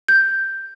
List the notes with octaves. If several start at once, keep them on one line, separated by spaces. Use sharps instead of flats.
G6